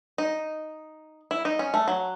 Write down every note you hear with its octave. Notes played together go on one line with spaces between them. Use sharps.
D#4
E4
D#4
C#4
A3
F#3